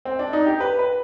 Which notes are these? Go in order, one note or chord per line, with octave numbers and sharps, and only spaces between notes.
C4
D4
D#4
G4
B4
B4